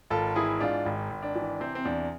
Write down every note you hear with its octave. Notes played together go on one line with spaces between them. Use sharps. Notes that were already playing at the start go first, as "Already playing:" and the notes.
G#1 F4 A4
E3 E4 G#4
G#2 D4 F4
G#1
G#1
D4
E3
C3 C4
C4
E2 D4